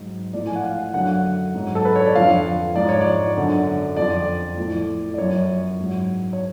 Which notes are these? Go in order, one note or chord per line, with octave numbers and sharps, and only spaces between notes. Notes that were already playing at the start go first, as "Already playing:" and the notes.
Already playing: G#2 F#3
A2 F3 D5
G#5
F#5
F5
F#2 D3 F#3 F#5
G#2 F#3
A4
B4
C#5
D5
F2 D3 F3 F5
G#2 F3 D5
C#5
D5
F#2 D3 F#3
F2 F3 D5
A2 F3
D5
F#2 F3 C#5
G#2 F#3
C#5